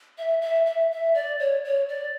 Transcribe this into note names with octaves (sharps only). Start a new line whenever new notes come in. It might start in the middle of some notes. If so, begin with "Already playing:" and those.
E5
E5
E5
E5
D5
C#5
C#5
D5